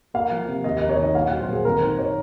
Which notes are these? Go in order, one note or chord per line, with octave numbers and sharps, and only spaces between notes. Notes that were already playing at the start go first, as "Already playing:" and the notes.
A#3 F5
F3
C3
D#2 D#5
A#3 D#5
C#5
D#3 D#5
A#1 F5
F#3 F#5
C5
A#2 G#4
G#1 A#4
D#3 C5
C#5